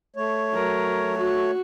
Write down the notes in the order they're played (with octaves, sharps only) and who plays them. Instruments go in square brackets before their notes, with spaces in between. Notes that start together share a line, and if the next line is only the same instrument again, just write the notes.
[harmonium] A3 C#5
[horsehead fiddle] F#3 A#4
F#4